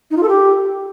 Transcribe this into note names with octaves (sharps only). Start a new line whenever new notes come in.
D#4
F4
A4
G4